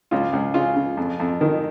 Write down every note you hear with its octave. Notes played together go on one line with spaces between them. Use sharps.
C#2 F4
C#2
C#3 F4
C#3
F2
F2
D#3